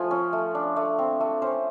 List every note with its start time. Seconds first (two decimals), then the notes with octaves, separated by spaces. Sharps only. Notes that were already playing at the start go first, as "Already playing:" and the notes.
Already playing: F3 A3 G#5
0.11 C#4
0.33 A3
0.55 D4
0.76 A3
0.99 C4
1.20 A3
1.42 C#4 C5